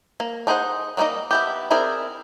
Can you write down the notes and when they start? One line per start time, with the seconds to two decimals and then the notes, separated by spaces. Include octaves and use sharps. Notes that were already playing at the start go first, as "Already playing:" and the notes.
0.20 A#3
0.47 D4 D#4 G#4 C5 F#5
0.97 F#3 G3 A#3 D#4 D#5
1.31 B3 E4 G4
1.70 C4 E4 G#4 A#4 D5